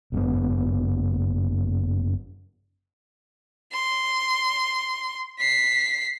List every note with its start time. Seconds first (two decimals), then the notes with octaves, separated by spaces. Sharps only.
0.12 G1 F#2 A2 B3
3.73 C6
5.39 B6 C7